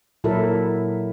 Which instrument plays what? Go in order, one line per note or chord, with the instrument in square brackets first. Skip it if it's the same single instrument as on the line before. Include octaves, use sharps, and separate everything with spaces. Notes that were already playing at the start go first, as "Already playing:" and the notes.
[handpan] A#2 F#3 E4 A4 A#4 E5